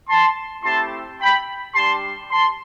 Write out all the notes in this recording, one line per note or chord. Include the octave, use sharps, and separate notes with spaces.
A5 C6
A3 C4 E4 G4 A5 C6
G5 B5
G3 D4 G4 A5 C6
A5 C6